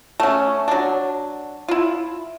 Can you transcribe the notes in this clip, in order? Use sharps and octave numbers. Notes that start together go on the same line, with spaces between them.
A3 C#4
F#3 D4
E4 F4